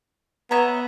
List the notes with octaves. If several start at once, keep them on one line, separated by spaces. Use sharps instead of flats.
B3 C#5 E5 A#5 D#6